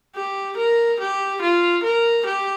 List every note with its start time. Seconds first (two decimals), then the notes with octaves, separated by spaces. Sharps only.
0.16 G4
0.57 A#4
1.00 G4
1.42 F4
1.84 A#4
2.26 G4